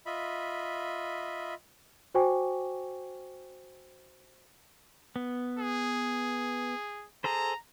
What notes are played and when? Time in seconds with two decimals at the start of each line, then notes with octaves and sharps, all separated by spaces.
0.06 F4 D#5 E5 B5
2.14 F#4 C5 G5 G#5 C#6 D6
5.16 B3
5.59 G#4
7.24 G#4 A4 C5 A#5